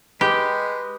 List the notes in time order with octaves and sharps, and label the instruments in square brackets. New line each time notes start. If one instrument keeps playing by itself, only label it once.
[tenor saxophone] G#3 [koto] G4 [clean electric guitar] B4